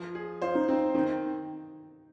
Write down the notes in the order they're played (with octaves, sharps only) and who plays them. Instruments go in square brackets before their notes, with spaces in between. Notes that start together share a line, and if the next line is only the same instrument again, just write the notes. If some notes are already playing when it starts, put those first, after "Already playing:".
Already playing: [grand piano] F3
G#4
[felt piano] F4 [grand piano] C5
[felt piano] D#4
[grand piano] C4 [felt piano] D#4
[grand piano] D#3 [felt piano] D#4